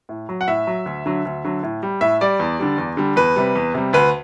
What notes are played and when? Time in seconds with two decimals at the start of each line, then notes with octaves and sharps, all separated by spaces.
0.09 A2
0.29 F#3
0.41 F#5
0.48 A2 E5
0.67 F#3
0.86 D2
1.06 D3 F#3
1.25 D2
1.45 D3 F#3
1.63 A2
1.83 G3
2.01 A2 E5
2.21 G3 D5
2.40 E2
2.60 D3 G3
2.78 E2
2.97 D3 G3
3.16 E2 B4
3.36 C3 G3
3.55 E2
3.74 C3 G3
3.93 D2 B4